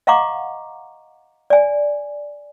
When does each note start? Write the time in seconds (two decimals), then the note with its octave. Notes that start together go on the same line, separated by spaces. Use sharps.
0.07 D#5 F5 F#5 A#5 C#6 D6
1.50 D5 G#5